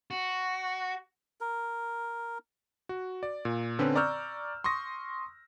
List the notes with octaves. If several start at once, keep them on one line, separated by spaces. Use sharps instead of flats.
F#4
A#4
F#4
D5
A#2
D3 C4 C#4 B4
D5 A#5 C#6 E6 F6 G6
C6 C#6 D#6 A#6